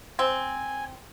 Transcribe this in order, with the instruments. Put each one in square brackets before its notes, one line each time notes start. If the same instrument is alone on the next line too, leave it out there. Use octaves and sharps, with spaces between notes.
[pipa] C4 [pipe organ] G#5